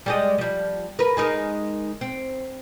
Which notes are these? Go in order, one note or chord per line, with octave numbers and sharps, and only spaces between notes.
G3 G#3 D#5
F3 G3
A#4 B4
G#3 D#4 A#4
C4